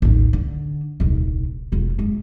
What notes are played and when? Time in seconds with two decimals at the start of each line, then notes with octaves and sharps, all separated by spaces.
0.02 A1 D#2
0.33 D3
1.00 D#1 C2
1.72 E1 F4
1.98 G2 G#3